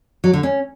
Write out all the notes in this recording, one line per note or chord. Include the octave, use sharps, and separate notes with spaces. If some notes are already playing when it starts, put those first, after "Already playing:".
F#3
D3
C#4